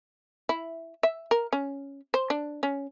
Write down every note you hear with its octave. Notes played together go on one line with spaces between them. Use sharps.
E4
E5
A#4
C#4
C5
D4
C#4